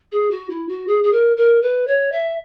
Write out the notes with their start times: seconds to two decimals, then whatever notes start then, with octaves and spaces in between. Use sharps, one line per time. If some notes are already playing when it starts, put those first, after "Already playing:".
0.12 G#4
0.31 F#4
0.50 E4
0.69 F#4
0.87 G#4
1.04 G#4
1.13 A#4
1.37 A#4
1.62 B4
1.87 C#5
2.12 E5